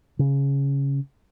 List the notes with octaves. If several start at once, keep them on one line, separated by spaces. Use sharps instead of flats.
C#3